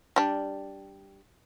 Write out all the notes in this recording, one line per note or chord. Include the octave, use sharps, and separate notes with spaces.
G3 D4